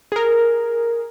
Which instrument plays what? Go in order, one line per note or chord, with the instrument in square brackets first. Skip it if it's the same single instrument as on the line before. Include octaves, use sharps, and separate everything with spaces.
[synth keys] G#4 A#4